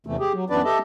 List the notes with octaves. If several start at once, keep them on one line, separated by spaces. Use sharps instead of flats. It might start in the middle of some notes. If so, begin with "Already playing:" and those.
E2 C3 E3 A3
G4 G#4
F#3
F#2 E3 B3 D4 B4 D5
G4 A4 D#5 E5 A5